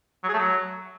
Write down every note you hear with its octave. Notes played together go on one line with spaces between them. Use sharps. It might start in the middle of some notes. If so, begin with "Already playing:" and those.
F#3
G#4
A3
F#3